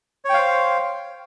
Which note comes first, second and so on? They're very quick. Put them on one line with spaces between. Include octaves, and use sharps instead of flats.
C#5 G5 F5 C5